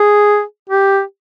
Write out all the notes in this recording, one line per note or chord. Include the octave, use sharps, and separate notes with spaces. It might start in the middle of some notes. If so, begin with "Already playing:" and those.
Already playing: G#4
G4